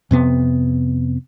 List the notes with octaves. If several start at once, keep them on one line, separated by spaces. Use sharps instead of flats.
F2 C3 B3